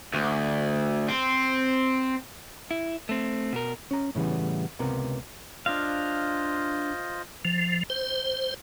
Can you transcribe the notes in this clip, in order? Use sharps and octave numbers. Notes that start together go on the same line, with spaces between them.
D2
C4
E4
A3 C4
B2 A#4
C#4 A#5
A2 C#3 E3 G3 B3
C#2 C3 B3 A#4
D4 F4 C5 D#5 F5
F3
C5